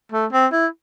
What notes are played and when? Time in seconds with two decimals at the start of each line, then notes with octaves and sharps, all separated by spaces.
0.12 A3
0.33 C4
0.53 E4